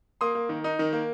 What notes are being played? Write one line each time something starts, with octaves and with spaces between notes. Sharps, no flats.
A#3 C6 D#6
A#3
D#3
D#4
D#3
A#3